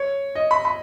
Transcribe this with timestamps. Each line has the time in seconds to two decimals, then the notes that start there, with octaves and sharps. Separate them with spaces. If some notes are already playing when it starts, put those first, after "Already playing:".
Already playing: C#5
0.35 D#5
0.51 B5
0.65 B5